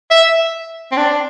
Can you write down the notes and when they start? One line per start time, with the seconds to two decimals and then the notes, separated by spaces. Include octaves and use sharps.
0.11 E5
0.92 C4
0.97 D4